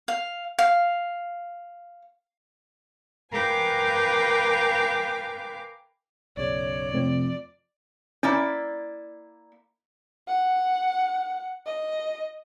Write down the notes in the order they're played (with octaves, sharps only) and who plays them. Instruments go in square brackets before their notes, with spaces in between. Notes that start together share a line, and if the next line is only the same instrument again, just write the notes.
[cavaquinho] F5
F5
[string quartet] A#4 B4 F5 G5 G#5 D6
[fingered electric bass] B1 F#2 C#3 [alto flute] C#5 [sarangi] D5
[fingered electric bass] F2 F3 [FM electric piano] C3 A3 C4
[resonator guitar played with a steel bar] A#3 E4 D5 [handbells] C#4
[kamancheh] F#5
D#5